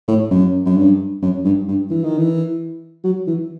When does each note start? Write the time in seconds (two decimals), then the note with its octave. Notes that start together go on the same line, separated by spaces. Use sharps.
0.08 A2
0.31 F#2
0.66 F#2
0.77 G2
1.22 F#2
1.45 G2
1.68 G2
1.91 E3
2.04 D#3
2.18 E3
3.04 F#3
3.27 E3